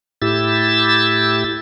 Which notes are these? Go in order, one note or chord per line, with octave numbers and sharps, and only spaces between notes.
A2 E4 G4 E6 A6